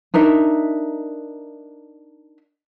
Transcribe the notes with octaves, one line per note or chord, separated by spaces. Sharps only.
D4 D#4 A#4 E5